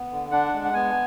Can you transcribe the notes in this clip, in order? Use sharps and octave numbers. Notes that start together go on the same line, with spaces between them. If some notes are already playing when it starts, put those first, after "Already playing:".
Already playing: B3
D3
D4 F#5
G#3
F#5
B3 G#5